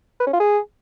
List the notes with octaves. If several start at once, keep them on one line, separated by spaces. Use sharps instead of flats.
B4
C#4
F4
G#4